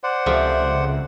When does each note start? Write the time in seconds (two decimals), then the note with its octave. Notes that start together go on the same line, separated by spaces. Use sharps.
0.03 C5 D5 F#5
0.26 C#2 C3 F3 A3